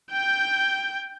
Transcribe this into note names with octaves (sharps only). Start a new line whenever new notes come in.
G5 G6